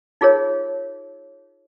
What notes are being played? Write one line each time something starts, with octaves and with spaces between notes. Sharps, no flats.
D#4 F4 G#4 A#4 C#5